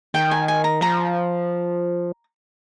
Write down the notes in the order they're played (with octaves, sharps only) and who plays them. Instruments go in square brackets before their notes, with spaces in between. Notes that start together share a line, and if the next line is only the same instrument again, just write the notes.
[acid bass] D#3 [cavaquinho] G5
[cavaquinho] G#5
G#5
A#5
[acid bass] F3 [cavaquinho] A#5